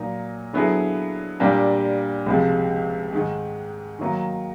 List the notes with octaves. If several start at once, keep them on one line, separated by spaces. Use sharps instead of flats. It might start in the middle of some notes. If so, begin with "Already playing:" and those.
Already playing: A#2 F#3 A#3 D#4
D3 F#3 B3 E4 G#4
A#2 G3 A#3 D4 G4
C#2 C3 F3 G#3
G#2 D#3 G#3
D#3 F#3 A#3 D#4